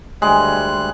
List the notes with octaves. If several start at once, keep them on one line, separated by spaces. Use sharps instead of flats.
D2 G3 G#3 F#6